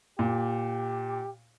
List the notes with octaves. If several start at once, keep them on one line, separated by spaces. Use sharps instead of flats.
A#2 G4